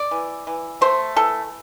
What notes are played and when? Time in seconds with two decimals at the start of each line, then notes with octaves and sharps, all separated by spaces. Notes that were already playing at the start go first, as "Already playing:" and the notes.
Already playing: D5
0.11 E3
0.47 E3
0.81 A3 C5
1.17 E3 A4